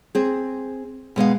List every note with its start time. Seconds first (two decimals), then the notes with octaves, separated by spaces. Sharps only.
0.15 C4 G#4
1.16 B2 G#3 B3 F5